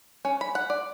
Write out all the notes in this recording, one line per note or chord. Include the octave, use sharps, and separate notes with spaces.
C#4
B5
F#5
D5